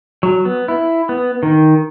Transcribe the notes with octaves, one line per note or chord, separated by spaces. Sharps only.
F#3
B3
E4
B3
D#3